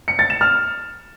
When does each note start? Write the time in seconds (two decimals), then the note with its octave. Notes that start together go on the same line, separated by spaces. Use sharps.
0.08 C#7
0.19 A6
0.30 E7
0.41 F6